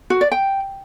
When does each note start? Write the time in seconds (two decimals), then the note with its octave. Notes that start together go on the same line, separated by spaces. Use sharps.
0.10 F#4
0.21 D5
0.32 G5